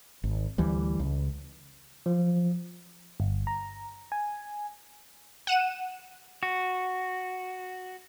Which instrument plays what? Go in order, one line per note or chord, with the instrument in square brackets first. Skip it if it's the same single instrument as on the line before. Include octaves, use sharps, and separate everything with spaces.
[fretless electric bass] G#1
D2 E3 G3
C#2
[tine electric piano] F3
[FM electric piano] G1
A#5
G#5
[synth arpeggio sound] F#5 D#7 E7
[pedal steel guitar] F#4